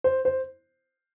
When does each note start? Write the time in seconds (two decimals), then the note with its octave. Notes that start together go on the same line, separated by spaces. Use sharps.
0.04 C5
0.25 C5